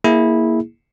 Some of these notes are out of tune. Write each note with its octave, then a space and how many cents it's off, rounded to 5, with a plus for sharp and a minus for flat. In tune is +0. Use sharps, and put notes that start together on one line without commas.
A#3 +5 E4 -10 G#4 +0